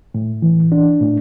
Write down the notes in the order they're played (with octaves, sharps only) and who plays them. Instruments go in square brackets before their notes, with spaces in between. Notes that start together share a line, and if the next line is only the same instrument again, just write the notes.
[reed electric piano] A2
E3
D4
A2